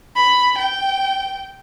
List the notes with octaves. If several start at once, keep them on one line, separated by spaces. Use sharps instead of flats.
B5
G5